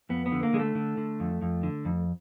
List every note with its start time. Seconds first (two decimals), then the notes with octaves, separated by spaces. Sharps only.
0.09 F2 B3
0.26 B3
0.32 D3
0.43 A#3
0.53 D3 G#3
0.59 A3
0.75 D3
0.97 D3
1.20 F2
1.42 F2
1.63 D3
1.85 F2